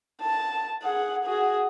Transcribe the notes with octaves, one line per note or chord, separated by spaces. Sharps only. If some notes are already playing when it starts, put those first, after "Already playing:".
A5
G#4 F#5
F#4 G#4